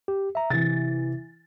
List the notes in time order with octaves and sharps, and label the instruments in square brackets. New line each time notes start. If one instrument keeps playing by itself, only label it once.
[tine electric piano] G4
E5 A#5
[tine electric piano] C3 [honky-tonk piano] E3 A6